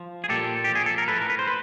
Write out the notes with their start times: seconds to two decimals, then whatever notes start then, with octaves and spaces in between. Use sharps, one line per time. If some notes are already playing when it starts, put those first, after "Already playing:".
Already playing: F3
0.24 G#4
0.29 A#2 G4 A4
0.64 F3 G4
0.75 G#4
0.86 A4
0.98 A#4
1.08 A2 A4 B4
1.22 A#4
1.30 B4
1.39 C5
1.47 B4